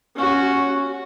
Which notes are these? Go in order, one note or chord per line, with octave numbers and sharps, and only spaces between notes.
C#4 F#4